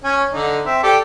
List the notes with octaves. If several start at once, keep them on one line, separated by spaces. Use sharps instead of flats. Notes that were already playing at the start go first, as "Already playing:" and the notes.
C#4 G#5
D3 D#4
C4 E5
G4 A4 D5